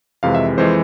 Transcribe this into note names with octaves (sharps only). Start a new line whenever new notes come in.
F2 C3 E3 G#3 F5
E5
F2 E3 G#3 C5